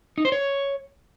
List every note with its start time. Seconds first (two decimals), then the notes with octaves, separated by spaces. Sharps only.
0.18 D#4
0.25 C5
0.32 C#5